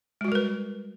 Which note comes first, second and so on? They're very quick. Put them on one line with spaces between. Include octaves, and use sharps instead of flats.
G#3 F#4 G3 A#4 B4